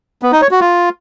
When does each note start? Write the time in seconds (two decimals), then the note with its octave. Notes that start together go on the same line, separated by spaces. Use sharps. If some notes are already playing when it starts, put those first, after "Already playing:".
0.22 B3
0.32 D#4
0.42 C#5
0.51 F#4
0.61 F4